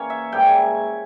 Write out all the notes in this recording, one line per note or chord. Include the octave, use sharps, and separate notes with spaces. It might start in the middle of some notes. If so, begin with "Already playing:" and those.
Already playing: E3 A#3 C#4 C#5
E5
G#2 G3 A#3 E4 G5
G#5